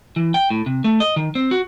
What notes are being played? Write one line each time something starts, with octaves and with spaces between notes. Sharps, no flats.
E3
G5
A2
C3
A3
D#5
D#3
C4
F#4